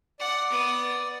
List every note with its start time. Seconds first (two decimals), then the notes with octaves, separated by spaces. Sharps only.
0.20 D5 F#5
0.50 B3 D#6